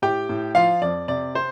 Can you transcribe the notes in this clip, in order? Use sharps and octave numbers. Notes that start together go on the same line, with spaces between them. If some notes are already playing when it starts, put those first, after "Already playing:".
A2 G4 G5
A2
F3 F4 F5
F2 D5
C3 D5
C4 C5